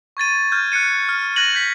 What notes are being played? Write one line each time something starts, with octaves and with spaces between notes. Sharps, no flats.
C#6 G#6 A6 D#7
F6 G6 G#6
F#6 G#6 C#7 D#7
F6
F#6 G#6 A#6 D#7 F#7
G6 B6